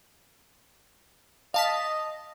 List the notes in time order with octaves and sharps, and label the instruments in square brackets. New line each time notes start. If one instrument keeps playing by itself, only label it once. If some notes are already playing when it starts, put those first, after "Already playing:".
[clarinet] D#5 [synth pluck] F5 A5 B6